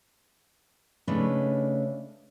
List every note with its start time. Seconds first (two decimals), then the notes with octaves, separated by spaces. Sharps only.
1.07 C#3 A3 D4 D#4 B4 C#5